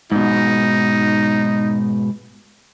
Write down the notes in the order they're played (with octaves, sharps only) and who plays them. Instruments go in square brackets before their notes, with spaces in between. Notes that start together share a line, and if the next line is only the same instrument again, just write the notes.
[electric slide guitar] G#2 B2 [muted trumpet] D#4